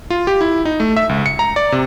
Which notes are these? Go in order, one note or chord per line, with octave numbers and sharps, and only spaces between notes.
F4
G4
E4
D#4
A3
E5
C#2
C#7
A#5
D5
C3